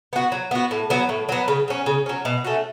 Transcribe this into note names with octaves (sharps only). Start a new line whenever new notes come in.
B3 F#4
F#3
B3 F#4
A2
F#3 B3
A2
F#3 B3
C#3
F#3 C#4
C#3
F#3 C#4
B2
A3 C#4 F#4